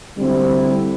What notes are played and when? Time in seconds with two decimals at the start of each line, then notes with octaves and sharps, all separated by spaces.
0.17 D2 D3 G3 C4 E4